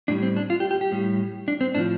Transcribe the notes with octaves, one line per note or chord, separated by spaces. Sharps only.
A2 G3 D4
C4
D4
F4
G4
G4
G4
A2 G3
D4
C4
A2 F3 D4